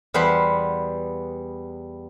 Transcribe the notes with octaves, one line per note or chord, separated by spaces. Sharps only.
E2 G3 B3 C5 F#5